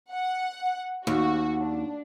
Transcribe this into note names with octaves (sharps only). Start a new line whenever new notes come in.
F#5
D#2 F#4
D4